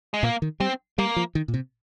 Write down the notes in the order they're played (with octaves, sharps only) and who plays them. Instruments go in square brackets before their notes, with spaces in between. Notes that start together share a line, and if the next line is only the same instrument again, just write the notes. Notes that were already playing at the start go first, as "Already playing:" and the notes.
[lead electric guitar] G#3
[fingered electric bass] A#2 [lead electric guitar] A#3
[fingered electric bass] D#3
[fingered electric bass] G3 [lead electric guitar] C4
[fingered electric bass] G3 [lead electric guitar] A#3
[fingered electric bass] F3
D#3
A#2
C3